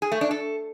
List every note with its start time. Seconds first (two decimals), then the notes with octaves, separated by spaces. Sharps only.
0.02 G#4
0.12 A3
0.21 D4
0.31 A4